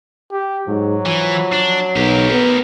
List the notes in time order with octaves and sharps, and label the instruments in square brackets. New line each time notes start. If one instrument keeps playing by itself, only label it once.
[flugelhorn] G4
[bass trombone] G#2 [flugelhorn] F#3
[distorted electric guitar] E3 [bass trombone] F3
[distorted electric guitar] D4
[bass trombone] B1 [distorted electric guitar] G4 A#4
[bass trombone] B3